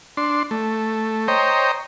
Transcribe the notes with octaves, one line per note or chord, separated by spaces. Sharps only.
D4 C6
A3
C5 C#5 D#5 G5 A#5